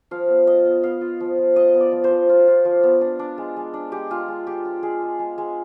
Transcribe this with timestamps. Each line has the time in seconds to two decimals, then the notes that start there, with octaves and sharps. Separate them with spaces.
0.11 F3 F5
0.29 B3
0.47 F4 D#5
0.65 B3
0.83 B3 F5
1.01 F4
1.20 F3
1.38 F3
1.56 F4 D#5
1.74 B3
1.80 D5
1.92 F3
2.04 C5
2.11 F3
2.29 F4
2.48 F4
2.65 F3
2.83 B3
3.01 D4
3.19 D4
3.38 G#3
3.57 G#3
3.74 D4
3.92 G#3 G4
4.10 G#3 F4
4.28 G#3
4.47 F4 G4
4.65 F4
4.83 G#3 G#4
5.02 G#3
5.19 G#3
5.38 G#3